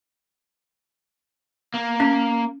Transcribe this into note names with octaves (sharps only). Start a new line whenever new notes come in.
A#3
C#4